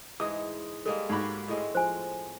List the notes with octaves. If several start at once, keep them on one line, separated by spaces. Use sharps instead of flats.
G#2 E3 G#3 D#6
G3 G#3 A#3 A4
G#2 F#4 G4 C#5 B5
A2 G#3 C4
F3 C5 G#5